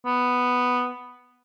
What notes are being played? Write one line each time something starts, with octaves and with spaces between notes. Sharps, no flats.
B3